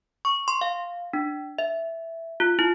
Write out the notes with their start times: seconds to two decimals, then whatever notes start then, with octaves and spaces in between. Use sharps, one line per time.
0.25 C#6
0.48 C6
0.61 F5
1.13 D4
1.59 E5
2.40 F4
2.59 E4